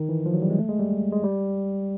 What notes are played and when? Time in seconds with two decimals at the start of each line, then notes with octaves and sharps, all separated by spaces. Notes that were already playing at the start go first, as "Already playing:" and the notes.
Already playing: D#3
0.09 E3
0.26 F3
0.34 F#3
0.42 G3
0.50 G#3
0.59 A3
0.69 G#3
0.79 G3
1.12 G#3
1.24 G3